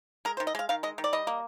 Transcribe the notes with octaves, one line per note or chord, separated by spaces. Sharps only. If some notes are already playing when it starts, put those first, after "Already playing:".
G#3 A#4
C5
D#3
D#5
G#3 F5
D#3 F5
G#3 D#5
D#3
D5
G3 D#5
A#3